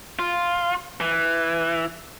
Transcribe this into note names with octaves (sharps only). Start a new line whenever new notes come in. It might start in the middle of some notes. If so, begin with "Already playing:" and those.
F4
E3